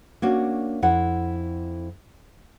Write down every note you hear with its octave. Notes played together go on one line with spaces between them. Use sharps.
A#3 C#4 D4 F#4
F2 E4 F#5